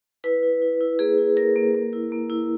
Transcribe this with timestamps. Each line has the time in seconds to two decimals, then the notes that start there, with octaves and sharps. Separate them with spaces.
0.24 E4 B4
0.43 E4
0.62 E4
0.80 E4
0.99 A#3 G#4
1.18 E4
1.37 A#3 A#4
1.56 A#3
1.75 A#3
1.93 E4
2.12 A#3
2.30 E4